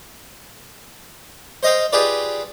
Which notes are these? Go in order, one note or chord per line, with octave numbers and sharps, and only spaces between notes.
C5 D#5 F5 G5
F4 G4 G#4 B4 D5